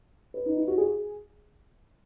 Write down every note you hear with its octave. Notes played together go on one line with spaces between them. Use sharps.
B4
D#4
E4
F#4
G#4